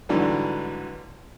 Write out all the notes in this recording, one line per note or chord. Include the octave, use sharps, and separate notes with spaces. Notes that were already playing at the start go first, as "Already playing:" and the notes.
G#2 D3 E3 F#3 G3 B3